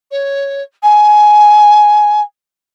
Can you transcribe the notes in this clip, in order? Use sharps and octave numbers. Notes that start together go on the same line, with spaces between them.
C#5
G#5